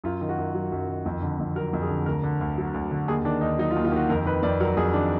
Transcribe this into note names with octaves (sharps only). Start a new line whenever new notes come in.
F#2 F4
D#3
F#4
F#2
F#3
F#2
D#3
F2
D3
F2
F#3 A#4
F2
G#4
D3
D2 A#4
D3
D2
F#3
D2
D3
D#2 G#4
D#3 D4
D#2 D#4
F#3 D#4
F4
D#2
F4
D#3 F#4
F2 A#4
D#3 B4
F2 D5
F#3 A#4
F2 G#4
D#3 D4